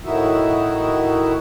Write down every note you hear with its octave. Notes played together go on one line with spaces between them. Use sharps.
A2 D#3 D#4 E4 F#4 E5